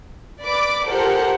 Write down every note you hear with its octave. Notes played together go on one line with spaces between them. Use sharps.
B4 D5 B5 D6
F4 G4 A4 A#4 C5 F#5